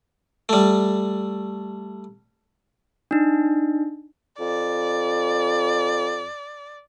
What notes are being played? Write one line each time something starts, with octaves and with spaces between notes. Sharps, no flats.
G3 A3
D4 D#4
F2 D5